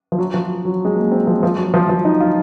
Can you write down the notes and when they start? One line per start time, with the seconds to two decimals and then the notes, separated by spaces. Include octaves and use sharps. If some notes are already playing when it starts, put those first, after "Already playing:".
0.12 F3
0.19 F#3
0.34 F3
0.65 F#3
0.85 G#3
0.96 A#3
1.12 C4
1.27 F3
1.43 F3
1.58 F#3
1.74 F3
1.89 F3
2.05 D#4
2.20 F4